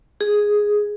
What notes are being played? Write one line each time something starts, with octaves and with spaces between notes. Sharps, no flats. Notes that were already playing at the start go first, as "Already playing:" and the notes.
G#4